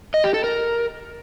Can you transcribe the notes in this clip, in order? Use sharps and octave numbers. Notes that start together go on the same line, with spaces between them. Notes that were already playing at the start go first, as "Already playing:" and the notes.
D#5
G4
A4
A#4